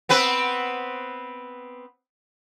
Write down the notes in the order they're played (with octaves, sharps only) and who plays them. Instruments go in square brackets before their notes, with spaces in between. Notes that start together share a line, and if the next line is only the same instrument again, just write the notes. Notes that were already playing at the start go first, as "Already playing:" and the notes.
[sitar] B3 C4 B4